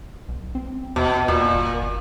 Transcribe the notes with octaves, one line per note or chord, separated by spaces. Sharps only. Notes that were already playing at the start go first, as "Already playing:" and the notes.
B1
C4
E2 B2
E2 A#2
G1